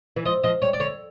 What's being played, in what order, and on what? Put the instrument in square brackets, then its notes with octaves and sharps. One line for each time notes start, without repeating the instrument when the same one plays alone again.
[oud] E3
[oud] F3 [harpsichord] D#5
[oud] F3 [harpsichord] D#5
[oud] G3 [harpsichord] C#5
[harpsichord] D5
[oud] D3 [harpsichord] C#5